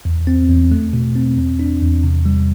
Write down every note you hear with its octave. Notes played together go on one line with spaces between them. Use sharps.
E2
C4
E2
A3
B2
C4
E2
D4
E2
C3
G3